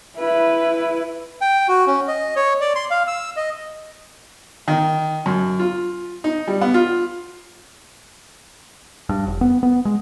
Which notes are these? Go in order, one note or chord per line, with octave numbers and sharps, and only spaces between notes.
E4 B4
G5
F#4
C#4
D#5
C#5
D5
C6
F5
E6
D#5
D#3
F#2
F4
D#4
G3
B3
F4
G2
F1
B3
B3
G#3